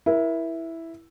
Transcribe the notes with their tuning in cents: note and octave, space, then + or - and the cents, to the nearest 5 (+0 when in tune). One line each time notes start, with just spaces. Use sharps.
E4 +0 A#4 +30